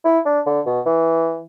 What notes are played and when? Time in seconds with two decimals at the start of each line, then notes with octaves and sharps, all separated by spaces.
0.05 E4
0.26 D4
0.46 D3
0.66 B2
0.86 E3